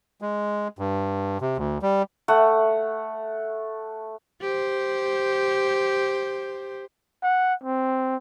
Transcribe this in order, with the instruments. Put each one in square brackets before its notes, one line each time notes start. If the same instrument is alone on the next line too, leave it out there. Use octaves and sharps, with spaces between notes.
[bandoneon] G#3
G2
C3
D2
G3
[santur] A3 F#5
[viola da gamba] G4 C5
[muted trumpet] F#5
C4